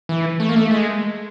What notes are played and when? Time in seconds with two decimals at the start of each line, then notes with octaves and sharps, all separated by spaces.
0.09 E3
0.40 A3
0.49 A#3
0.56 A3
0.71 G#3